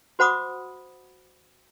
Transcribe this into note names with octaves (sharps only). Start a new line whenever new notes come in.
F#4 C5 F#5 B5 D6 D#6